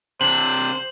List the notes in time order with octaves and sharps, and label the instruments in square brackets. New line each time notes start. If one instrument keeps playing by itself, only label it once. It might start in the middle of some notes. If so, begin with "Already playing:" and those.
[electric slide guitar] C3 D4 [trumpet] C5 [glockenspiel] F#7